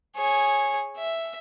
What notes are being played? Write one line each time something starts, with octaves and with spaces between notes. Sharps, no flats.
G#4 C#5
E5